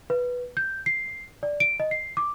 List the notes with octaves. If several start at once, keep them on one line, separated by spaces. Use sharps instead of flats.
B4
G6
C7
D5
D7
D#5
C7
D6